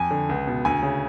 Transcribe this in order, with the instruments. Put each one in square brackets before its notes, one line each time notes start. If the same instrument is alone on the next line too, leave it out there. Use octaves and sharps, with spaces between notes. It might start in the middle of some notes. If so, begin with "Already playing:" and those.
Already playing: [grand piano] F2 G#5
D3
C#2
B2
D2 G#5
C#3